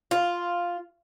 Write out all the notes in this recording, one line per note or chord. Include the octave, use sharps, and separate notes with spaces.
F4